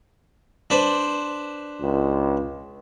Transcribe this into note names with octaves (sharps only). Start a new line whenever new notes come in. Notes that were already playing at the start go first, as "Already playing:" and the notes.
D4 B4 C5
C#2